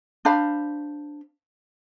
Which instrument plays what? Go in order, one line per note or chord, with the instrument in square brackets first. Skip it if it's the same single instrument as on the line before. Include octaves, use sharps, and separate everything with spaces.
[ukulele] D4 C5 F5 B5